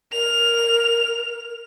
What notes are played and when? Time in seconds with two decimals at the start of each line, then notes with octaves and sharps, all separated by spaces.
0.12 A#4 F7